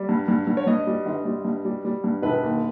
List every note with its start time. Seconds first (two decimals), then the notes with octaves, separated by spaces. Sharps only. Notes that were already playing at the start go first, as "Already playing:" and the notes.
Already playing: G3
0.09 G2
0.28 G2
0.47 G2
0.57 C#5
0.67 G2 D#5
0.87 G3
1.06 G1
1.25 G3
1.45 G2
1.65 G3
1.85 G3
2.04 G2
2.22 E1 B4
2.42 D#2